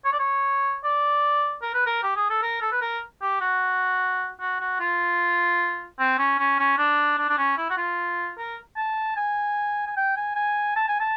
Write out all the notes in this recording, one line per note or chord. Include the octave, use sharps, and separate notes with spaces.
C#5
D5
C#5
D5
A#4
B4
A#4
G4
G#4
A4
A#4
A4
B4
A#4
G4
F#4
F#4
F#4
F4
C4
C#4
C#4
C#4
D4
D4
D4
C#4
E4
F#4
F4
A#4
A5
G#5
G#5
G5
G#5
G#5
A5
G#5
A5